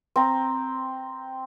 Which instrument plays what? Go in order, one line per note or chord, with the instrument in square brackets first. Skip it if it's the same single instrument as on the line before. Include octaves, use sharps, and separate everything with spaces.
[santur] C4 A#5